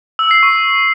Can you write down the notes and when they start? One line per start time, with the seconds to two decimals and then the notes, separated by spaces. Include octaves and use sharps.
0.19 E6
0.31 C7
0.43 C#6